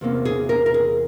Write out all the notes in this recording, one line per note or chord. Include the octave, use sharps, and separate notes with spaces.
E2 C3 E3 A#3 C#4
G#4
A#4
A#4
G#4